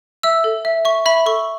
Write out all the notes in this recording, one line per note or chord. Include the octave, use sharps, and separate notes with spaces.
E5 E6
A4
E5
E5 C#6
E5 B5
A4 C#6